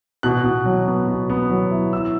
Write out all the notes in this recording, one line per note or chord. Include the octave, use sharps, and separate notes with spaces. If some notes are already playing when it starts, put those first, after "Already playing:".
B2 F#6
B2
F#3
B3
B2
B3
F#3
E4
E3 E6